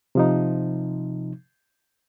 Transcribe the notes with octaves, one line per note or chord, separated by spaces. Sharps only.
C3 F3 D#4